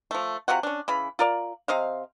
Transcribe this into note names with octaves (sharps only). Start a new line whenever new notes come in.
F3 A3
C3 F4 F#4 F#5
C#4 D4
C#3 E3 B5
F4 A#4 D5
C3 C5 D#5 F5